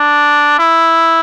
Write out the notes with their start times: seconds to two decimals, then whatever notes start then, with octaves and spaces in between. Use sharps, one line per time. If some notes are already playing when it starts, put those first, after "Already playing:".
Already playing: D4
0.59 E4